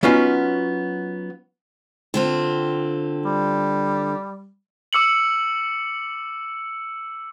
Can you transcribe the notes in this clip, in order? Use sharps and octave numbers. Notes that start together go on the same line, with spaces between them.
F#3 B3 C#4 D#4 F4 F#4
D3 C4 F4
G3
D6 E6 C#7 F#7